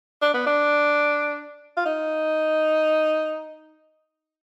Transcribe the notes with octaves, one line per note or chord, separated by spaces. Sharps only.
D4
B3
D4
F4
D#4